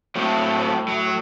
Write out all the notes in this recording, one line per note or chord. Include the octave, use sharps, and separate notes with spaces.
A2 F#3 C4
F#3